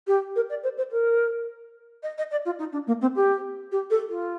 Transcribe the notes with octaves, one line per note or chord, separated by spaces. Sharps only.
G4
A#4
D5
C5
C5
A#4
D#5
D#5
D5
F4
D#4
D4
A#3
C4
G4
G4
A4
F4